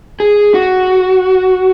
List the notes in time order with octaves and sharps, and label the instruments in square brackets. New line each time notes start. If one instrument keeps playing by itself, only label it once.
[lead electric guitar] G#4
F#4